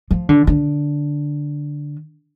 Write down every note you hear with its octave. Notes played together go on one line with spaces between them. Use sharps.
F3
D3
D3